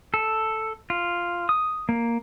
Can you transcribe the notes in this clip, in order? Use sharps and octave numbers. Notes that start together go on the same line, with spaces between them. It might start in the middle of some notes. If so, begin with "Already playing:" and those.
A4
F4
D#6
A#3